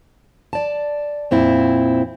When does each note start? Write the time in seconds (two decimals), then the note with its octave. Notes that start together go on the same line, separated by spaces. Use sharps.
0.53 D5 A5
1.31 F2 A#2 C4 E4